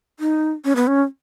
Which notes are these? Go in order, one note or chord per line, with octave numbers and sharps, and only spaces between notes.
D#4
C#4
B3
C#4